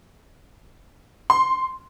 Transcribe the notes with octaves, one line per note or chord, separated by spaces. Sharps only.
C6